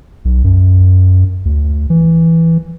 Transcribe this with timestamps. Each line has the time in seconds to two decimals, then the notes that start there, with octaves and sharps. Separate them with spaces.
0.25 B1
0.44 F#2
1.45 D2
1.90 E3